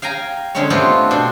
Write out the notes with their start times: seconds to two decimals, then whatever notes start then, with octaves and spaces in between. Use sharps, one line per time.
0.02 F5 G5 G#5 A#5
0.55 D3 G#3 C4 C#4 C#5
0.70 A3 B3 C4 F4 G4
1.10 B2 D4 C5